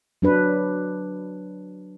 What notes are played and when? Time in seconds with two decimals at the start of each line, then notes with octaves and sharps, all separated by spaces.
0.22 F#3 D4 B4